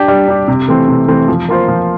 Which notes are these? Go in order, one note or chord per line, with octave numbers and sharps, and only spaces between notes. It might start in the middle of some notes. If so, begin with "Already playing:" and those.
Already playing: D4 G4
G3
D4 G4
C3
E3 A3 C4
C3
E3 A3 C4
F3
A#3 F4 C5
F3